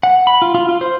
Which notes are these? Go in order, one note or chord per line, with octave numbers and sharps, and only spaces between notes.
F#5
B5
F4
F4
F4
C5